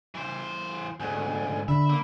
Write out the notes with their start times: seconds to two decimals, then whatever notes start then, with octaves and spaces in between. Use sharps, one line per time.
0.15 E3 C5
1.00 D2 G#2 G#5
1.68 D3 E5 B5
1.89 A#3